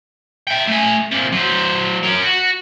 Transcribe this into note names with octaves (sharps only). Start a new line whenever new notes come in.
E5 G5
A3 G#5
C3 A#3
F#3 C5
C#4 A#4
F#4